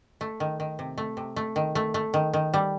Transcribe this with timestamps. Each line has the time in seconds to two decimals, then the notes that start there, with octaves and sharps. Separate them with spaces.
0.21 A3
0.40 D#3
0.60 D#3
0.79 C3
0.98 A3
1.17 C3
1.36 A3
1.56 D#3
1.75 A3
1.94 A3
2.14 D#3
2.34 D#3
2.54 G3